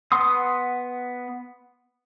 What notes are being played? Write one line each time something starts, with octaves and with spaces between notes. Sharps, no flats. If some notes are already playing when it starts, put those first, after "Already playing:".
B3 F#5 C6 D#6